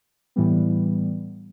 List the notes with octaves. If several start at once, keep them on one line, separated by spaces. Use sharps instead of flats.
A2 E3 G3 B3